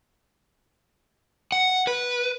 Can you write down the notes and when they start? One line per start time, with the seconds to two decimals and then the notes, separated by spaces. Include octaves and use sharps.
1.52 F#5
1.87 B4